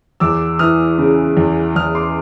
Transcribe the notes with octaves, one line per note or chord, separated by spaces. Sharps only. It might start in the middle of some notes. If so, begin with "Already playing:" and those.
E2 D6 E6
E3 D#6 F6
C#3
E2
E2 D#6 F6
C6 D6